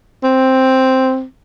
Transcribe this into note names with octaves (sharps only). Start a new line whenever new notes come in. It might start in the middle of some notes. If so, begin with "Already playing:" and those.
C4